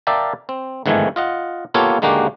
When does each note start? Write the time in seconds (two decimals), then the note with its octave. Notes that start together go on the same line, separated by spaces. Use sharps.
0.07 A#4 D5 E5 F5 G5 A5
0.49 C4
0.86 G1 G#2 D#3 E3 A3 G#5
1.16 F4 D#5 F#5
1.74 A#3 B3 F4 G4 A4 C#5
2.02 D#2 D3 G#3 A#3 F#4 G4